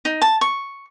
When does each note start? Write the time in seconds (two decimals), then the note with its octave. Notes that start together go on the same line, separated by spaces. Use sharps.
0.05 D#4
0.22 A5
0.41 C#6